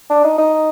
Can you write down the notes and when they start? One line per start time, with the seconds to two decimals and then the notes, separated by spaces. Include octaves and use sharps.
0.10 D4
0.24 D#4
0.38 D#4